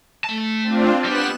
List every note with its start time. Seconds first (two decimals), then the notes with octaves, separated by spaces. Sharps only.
0.24 A3 A5
0.63 C4 D4 F4
1.04 G3 B3 G4 F#6 E7